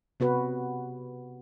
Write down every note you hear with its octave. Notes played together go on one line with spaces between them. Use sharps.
C3 B3 F#4 B4